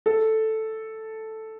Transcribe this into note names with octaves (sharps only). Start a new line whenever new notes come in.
A4